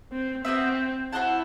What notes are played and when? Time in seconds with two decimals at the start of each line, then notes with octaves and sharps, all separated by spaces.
0.12 C4
0.45 B3 C4 F#4 B4 E5
1.12 E4 F#4 C5 F#5 A5